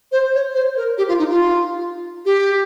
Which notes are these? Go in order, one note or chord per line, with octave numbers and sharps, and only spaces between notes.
C5
C#5
C5
A#4
G4
F4
D#4
F4
G4